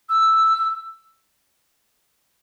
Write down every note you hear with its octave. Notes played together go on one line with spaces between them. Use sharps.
E6